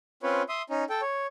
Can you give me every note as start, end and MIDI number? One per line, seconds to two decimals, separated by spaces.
0.23 0.42 60
0.23 0.42 61
0.23 0.42 65
0.23 0.42 71
0.23 0.42 73
0.49 0.62 76
0.49 0.62 84
0.49 0.62 87
0.70 0.84 61
0.70 0.84 63
0.90 1.01 69
0.90 1.01 79
1.02 1.27 73